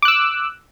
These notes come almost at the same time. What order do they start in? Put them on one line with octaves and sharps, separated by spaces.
D6 F#6 E6